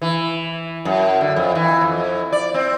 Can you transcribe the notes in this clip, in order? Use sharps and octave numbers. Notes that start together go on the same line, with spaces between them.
E3
F#2
D3
F2
E3
F2
D5
C4